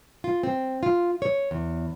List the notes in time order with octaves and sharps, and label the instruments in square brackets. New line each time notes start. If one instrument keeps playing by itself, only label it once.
[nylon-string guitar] F4
C4
F4
C#5
E2